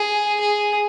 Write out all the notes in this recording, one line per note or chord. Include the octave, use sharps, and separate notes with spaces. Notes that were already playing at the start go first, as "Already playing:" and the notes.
Already playing: G#4
G#4